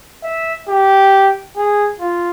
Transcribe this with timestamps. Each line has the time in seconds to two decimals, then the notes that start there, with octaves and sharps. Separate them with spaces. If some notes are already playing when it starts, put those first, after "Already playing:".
0.24 E5
0.68 G4
1.57 G#4
2.00 F4